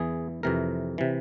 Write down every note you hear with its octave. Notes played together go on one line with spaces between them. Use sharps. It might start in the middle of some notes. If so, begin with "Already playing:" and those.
Already playing: E2 E3 G#4
F2 C3 E3 A#4
C3 E3